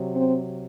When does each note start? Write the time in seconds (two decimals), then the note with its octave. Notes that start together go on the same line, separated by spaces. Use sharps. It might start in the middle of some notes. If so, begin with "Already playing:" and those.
Already playing: C3 F#3
0.15 C4